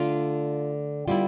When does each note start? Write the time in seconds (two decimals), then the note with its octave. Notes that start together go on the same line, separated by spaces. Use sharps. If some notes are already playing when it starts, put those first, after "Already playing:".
Already playing: D3 A3 D4 F4
1.08 D3 G3 B3 E4 F4